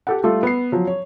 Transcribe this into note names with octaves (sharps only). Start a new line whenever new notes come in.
G4 A4 F#5
G3 A3 F4 A4
B3 C7
F3 F#3
C#5